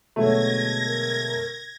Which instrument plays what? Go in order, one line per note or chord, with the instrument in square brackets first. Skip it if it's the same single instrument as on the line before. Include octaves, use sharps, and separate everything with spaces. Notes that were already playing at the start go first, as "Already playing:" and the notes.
[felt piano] B2 D3 G#3 [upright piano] F#3 A3 [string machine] G#6 A#6
[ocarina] A#4